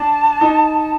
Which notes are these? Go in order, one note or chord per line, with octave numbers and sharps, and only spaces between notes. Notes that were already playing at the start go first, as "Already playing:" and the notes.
Already playing: D4 A5
D#4